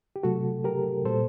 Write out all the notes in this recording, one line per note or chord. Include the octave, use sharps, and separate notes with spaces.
G4
C3 F#3 A3 F#4 A4
G4 A#4
A#2 G3 A#3 A4 C5